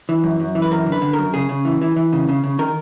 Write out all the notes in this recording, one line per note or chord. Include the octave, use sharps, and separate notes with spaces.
E3
F#2
F#2
E3
B4
F#2 A#4
D3
B4
D3
F#2 A#4
C#3 G#4
C#3
E3
E3
E3
C#3
C#3
C#3
D#3 A#4